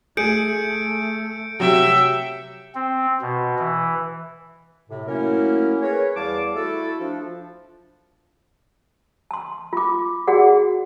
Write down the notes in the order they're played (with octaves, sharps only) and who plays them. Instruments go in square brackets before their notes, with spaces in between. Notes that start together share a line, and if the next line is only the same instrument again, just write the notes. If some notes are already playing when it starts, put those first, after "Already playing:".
[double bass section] A3 [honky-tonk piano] G#4 [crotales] G6 C#7 D7
[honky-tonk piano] C3 F#3 [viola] E5 G5
[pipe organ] C4
B2
E3
[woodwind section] A2 C3
F#3 A3 A#3 C#4 E4 A#4
G#4 A#4 B4 C#5
E2 G3 F5 A5 D6
A3 E4 F#4 A4
F3 D4
[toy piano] A5 C6
F4 D6
F#4 G#4 D5 F#5